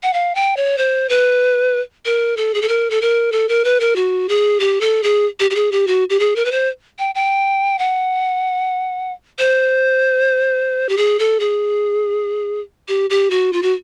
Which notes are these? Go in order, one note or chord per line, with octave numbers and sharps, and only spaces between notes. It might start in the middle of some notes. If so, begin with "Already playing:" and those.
F#5
F5
G5
C#5
C5
B4
A#4
A4
G#4
A4
A#4
A4
A#4
A4
A#4
B4
A#4
F#4
G#4
G4
A4
G#4
G4
G4
G#4
G4
F#4
G4
G#4
A#4
B4
C5
G5
G5
F#5
C5
G4
G#4
A4
G#4
G4
G4
F#4
F4
F#4